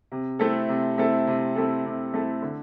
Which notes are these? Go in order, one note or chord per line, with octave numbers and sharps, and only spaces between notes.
C3
A3 C4 E4 A4
C3
A3 C4 E4 A4
C3
A3 C4 E4 A4
C3
A3 C4 E4 A4
D3